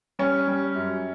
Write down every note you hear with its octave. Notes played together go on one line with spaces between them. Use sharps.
G3 C#4
G3
F#2